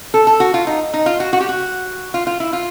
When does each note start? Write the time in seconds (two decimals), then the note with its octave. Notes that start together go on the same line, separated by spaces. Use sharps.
0.14 A4
0.27 A4
0.40 F#4
0.54 F4
0.67 D#4
0.94 D#4
1.06 F4
1.20 F#4
1.33 F#4
1.40 G4
1.49 F#4
2.14 F4
2.27 F4
2.40 E4
2.53 F4